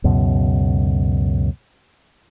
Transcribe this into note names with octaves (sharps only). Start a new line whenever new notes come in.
C#2 F#2 B2